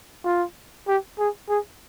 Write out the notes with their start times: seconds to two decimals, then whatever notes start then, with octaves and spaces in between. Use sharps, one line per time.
0.25 F4
0.88 G4
1.19 G#4
1.49 G#4